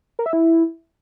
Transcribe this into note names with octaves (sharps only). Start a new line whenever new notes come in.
A#4
E5
E4